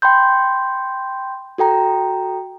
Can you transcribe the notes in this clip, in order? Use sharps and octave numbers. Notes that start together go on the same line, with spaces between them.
G5 B5 C6 G6
F#4 A4 G5 A#5